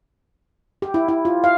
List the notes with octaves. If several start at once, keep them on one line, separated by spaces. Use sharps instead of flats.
G4
E4
E4
F4
F5